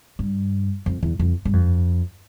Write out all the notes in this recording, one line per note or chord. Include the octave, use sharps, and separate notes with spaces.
G2
F2
E2
F2
G2
F2